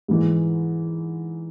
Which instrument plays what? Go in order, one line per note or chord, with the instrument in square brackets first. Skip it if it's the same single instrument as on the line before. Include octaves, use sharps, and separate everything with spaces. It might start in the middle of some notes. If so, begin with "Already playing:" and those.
[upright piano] G#2 E3 G#3